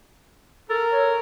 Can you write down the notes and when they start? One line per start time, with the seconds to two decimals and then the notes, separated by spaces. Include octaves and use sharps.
0.70 A4 A#4
0.92 C#5